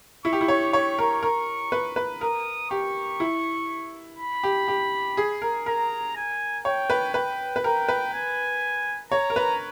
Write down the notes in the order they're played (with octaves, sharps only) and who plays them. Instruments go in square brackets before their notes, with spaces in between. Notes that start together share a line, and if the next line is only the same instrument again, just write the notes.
[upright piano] E4 [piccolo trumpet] C#6
[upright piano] G4
E4
C#5
[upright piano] C#5 [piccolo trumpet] C#6
[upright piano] A#4
A#4
B4
B4
[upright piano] A#4 [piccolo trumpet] D#6
[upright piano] G4 [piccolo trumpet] C#6
[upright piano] E4
[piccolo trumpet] B5
[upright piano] G4
G4
G#4
A#4
[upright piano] A#4 [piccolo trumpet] A#5
[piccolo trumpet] G#5
[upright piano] C#5 [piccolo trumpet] G5
[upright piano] B4
[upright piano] B4 [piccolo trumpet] G5
[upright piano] B4
[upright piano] A#4 [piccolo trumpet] G5
[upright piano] B4
[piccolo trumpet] G#5
[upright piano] C#5 [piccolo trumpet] A#5
[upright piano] A#4
B4